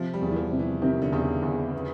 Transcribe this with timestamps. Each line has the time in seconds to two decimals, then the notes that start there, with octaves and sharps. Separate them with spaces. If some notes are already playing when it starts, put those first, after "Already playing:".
Already playing: C3 F3
0.14 G3
0.21 E2
0.31 E3
0.36 F3
0.51 C3
0.59 E3
0.82 C3 D#3
1.02 D3
1.12 E2 C#3
1.42 E2 D3
1.73 B3